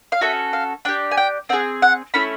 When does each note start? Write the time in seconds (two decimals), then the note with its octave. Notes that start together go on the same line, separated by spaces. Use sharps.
0.12 F5
0.21 C#4 F#4 A4 E5
0.53 F5
0.85 D4 G4 G5
1.11 G#5
1.17 G5
1.49 C4 F4 G#4 F#5
1.82 F#5
2.14 A3 C#4 E4 B5